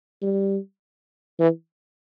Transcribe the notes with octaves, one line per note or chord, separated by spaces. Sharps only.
G3
E3